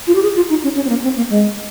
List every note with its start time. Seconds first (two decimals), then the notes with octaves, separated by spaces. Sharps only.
0.07 F4
0.15 G4
0.23 G#4
0.36 F4
0.50 D#4
0.63 C#4
0.76 C#4
0.85 C4
0.89 A#3
1.03 C4
1.17 A#3
1.30 G#3